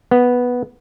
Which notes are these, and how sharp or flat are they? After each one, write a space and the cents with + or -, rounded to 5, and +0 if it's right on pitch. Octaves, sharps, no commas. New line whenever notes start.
B3 -5